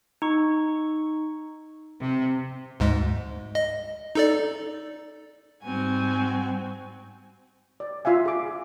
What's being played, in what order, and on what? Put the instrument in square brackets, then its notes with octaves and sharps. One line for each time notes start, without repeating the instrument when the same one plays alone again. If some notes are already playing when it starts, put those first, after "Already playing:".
[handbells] D#4 C#6
[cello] C3
[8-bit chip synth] D2 G#2 G#3
D#5
D#4 A4 D5
[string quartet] G#2 G3 C4 F#4 G#5
[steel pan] D5
F4 E5 F5 G#5
G#4 D6